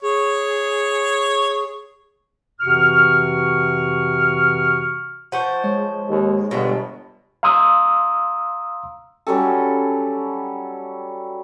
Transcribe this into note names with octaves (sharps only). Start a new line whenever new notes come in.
G#4 C#5
F2 C3 E3 F#4 C#6 F6
F3 C5 F#5 C#6
G#3 C#5
D#2
G1 B2
F5 A#5 C6 D#6 E6
F#3 G3 C#4 A4